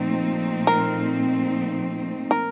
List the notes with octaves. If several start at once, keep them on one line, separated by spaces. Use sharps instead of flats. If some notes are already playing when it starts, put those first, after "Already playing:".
Already playing: A#2 F3 A3 C4 D#4
A#4
A#4